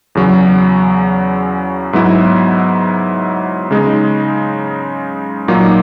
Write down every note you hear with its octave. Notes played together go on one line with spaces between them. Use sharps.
E2 C#3 F#3
G#2 F#3 B3 E4
C#3 G#3 D#4
A#2 F#3 A#3 D#4